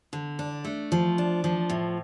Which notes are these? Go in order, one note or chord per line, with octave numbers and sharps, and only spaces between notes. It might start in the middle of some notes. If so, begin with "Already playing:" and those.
D3
D4
A3
F3
D4
F3
A2